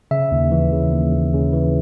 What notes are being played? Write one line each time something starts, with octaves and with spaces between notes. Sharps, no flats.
C#3 E5
D#2
E3
C#3
D#2
D#2
C#3
E3